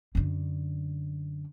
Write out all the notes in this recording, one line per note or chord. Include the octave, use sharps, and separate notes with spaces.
F#2 D3